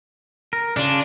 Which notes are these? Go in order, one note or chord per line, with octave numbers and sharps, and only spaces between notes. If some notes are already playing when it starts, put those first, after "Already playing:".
A#4
C#3 D4 F4